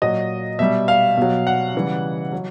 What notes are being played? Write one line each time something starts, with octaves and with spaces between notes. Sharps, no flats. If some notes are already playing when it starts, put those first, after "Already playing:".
A#2 F#3 D#5
B2 G3 E5
F5
B2 F#3
F#5
C#3 E3 G3
F#3